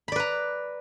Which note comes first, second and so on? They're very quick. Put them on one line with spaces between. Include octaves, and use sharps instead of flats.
B5 D5 B4 A#5